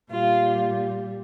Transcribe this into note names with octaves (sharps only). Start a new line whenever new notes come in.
A#2 G3 F4